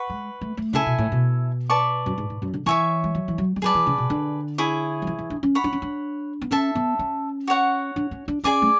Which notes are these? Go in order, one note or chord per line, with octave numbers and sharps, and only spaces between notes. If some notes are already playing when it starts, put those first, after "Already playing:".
Already playing: B4 F#5 C#6
G#3
A3
A3
C#3 E4 A4 E5 G#5
B2
A2
B2
B4 D5 A5 C#6
F#2
G#2
G#2
F#2
D3
E3 C#5 E5 G#5 C#6
G#3
F#3
E3
F#3
G#3
F#3 G#4 B4 D5 A5
E3
C#3
B2
D3
E4 G#4 C#5
F#3
E3
E3
D4
C#4
C#5 F#5 B5
D4
C#4
D4
B3
C#4 A4 E5 A5
B3
C#4
F#4 C#5 F#5
D4
C#4
D4
C#4 G#4 D5 G#5 D6
A3